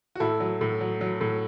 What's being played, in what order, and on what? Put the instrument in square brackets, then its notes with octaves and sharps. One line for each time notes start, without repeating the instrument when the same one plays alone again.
[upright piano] F#4
A2 E4 A4
F#3
A2
F#3
F#3
A2